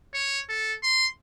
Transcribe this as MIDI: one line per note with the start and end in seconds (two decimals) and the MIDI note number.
0.14 0.40 73
0.49 0.74 69
0.83 1.08 84